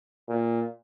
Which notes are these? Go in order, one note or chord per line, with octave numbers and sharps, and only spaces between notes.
A#2